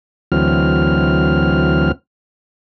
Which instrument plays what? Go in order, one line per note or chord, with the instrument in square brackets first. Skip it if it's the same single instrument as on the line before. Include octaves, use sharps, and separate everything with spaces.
[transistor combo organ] D2 E3 F#3 C4 F6